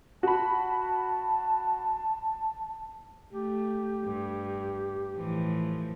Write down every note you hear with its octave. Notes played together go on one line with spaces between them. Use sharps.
F#4 A5 B5
A3 G4
G2
A2 E3 F3